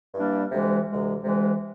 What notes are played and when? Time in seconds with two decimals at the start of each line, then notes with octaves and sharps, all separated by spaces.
0.14 G2 E3 G3 A#3 D4
0.51 D2 C3 E3 G#3
0.87 D2 C3 E3 G#3
1.23 D2 C3 E3 G#3